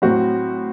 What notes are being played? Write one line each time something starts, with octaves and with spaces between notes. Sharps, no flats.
A2 F#3 C4 F#4